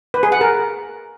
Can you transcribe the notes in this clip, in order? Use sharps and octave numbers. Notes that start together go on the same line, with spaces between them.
B4
G#4
F#5
A#4